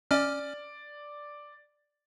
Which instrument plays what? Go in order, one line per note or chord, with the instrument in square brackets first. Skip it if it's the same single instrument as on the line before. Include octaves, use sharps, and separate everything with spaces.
[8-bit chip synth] C#4 F6 [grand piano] D5